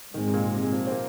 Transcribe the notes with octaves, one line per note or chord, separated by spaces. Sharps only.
G#2 D#3 G#3 C4
C3
A#2
C3
F3
C4
A#3